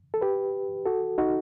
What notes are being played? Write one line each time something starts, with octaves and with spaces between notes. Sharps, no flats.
A4
G4 B4
F#4 A4
D#4 F#4